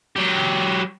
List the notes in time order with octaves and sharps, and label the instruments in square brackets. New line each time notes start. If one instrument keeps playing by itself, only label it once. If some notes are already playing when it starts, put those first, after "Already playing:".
[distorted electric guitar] F#3 G4